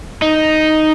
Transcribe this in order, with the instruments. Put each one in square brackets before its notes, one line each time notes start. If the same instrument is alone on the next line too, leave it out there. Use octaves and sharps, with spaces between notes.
[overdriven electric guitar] D#4